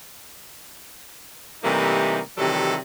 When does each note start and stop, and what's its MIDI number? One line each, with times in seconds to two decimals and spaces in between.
1.64 2.20 48
1.64 2.20 52
1.64 2.20 55
1.64 2.20 57
1.64 2.20 58
1.64 2.20 63
2.38 2.76 48
2.38 2.76 51
2.38 2.76 52
2.38 2.76 54
2.38 2.76 55
2.38 2.76 69